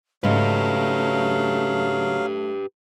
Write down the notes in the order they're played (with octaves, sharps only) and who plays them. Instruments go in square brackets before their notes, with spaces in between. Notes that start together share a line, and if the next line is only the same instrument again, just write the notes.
[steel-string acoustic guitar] G#2 C#3 [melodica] F#3 F5 [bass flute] A3 [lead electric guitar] G4 B4